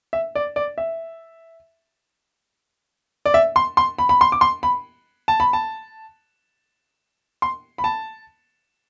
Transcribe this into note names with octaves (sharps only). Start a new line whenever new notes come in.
E5
D5
D5
E5
D5
E5
C6
C6
B5
B5
C6
D6
C6
B5
A5
B5
A5
C6
B5
A5